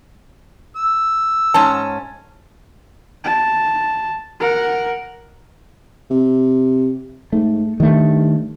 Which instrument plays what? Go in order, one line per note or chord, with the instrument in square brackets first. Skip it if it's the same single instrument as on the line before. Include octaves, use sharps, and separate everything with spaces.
[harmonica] E6
[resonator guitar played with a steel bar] G#2 C#4 A5
[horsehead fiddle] A5
A#4 F#5
[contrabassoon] C3
[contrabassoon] G#2 [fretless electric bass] A3
[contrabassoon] G2 [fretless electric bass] D#3 A3